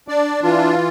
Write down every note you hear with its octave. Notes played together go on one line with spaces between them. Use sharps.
D4 D5
E3 F4